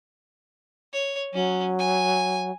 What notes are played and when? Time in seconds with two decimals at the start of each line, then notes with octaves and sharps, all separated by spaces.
0.93 C#5
1.34 F#3 C#4
1.79 G#5